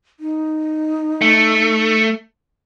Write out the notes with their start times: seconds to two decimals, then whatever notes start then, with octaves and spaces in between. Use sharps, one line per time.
0.20 D#4
1.22 A3